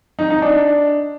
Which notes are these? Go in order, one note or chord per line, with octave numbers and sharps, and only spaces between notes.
D#4
D#4
D4